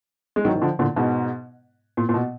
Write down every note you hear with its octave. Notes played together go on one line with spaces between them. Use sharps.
G#3
D#3 F#3
D#3
D3 F3
A#2 D3
G#2 B2
A#2
A#2
B2